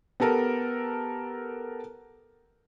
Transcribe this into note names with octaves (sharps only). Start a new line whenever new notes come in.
B3 G4 A4 A#4